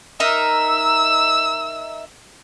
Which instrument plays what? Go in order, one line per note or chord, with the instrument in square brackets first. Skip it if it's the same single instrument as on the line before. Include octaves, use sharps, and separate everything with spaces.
[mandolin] D#4 A#4 E5 [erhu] E6